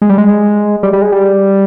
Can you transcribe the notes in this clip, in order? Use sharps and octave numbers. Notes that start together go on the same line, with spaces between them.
G#3
G3
G#3
G3
G3
G#3
G3